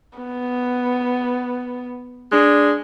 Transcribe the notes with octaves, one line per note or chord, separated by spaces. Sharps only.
B3
G#3 D4